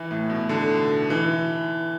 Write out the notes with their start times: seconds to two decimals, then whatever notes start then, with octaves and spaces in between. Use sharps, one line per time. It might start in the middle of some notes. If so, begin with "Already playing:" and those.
Already playing: E3
0.11 A2
0.30 B2
0.49 D3
1.10 E3